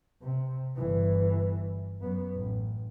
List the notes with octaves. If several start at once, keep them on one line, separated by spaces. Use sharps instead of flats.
C3
G1 E3
F#2 B3
A1